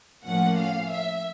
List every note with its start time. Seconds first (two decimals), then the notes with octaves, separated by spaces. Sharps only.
0.24 A2 F3 A#3 C#4 F#5
0.57 F5
0.90 E5